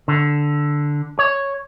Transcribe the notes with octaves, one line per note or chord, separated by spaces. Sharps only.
D3
C#5